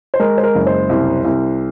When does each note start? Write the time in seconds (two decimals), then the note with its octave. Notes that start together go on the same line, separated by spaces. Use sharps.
0.14 C5
0.19 G#3 A#4
0.38 C5
0.43 A#4
0.55 F#1
0.67 C5
0.89 C2
1.25 C2